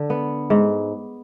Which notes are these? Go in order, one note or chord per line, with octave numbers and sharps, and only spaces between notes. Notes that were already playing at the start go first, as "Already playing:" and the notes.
Already playing: D3
B3
G#2